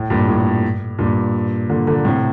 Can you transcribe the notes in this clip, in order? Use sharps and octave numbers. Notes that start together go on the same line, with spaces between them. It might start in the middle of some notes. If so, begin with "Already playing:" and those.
Already playing: A2
G2 A#2
A2
G2 A#2
A#2 D3
A#2 D3
A2 C3